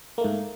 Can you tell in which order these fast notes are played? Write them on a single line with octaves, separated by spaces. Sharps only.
A#3 A3 G#2